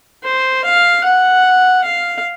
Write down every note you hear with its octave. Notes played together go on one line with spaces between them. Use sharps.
C5
F5
F#5
F5